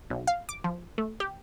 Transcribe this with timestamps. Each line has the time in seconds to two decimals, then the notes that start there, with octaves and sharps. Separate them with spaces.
0.10 B1
0.27 F5
0.49 D6
0.64 F3
0.98 A3
1.20 G4